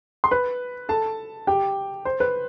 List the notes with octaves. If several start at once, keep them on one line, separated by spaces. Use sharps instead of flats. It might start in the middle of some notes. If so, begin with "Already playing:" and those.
C6
B4 B5
A4 A5
G4 G5
C5
B4